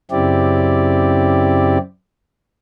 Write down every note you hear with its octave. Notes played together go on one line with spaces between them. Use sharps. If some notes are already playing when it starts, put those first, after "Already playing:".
F#2 C#3 C4 E4 G4 D5